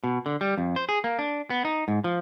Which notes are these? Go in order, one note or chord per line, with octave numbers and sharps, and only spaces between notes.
B2
D3
G3
F2
C5
G#4
A#3
D4
B3
D#4
G#2
F3